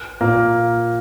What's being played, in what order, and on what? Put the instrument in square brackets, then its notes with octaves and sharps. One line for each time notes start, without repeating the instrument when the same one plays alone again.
[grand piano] A#2 A#3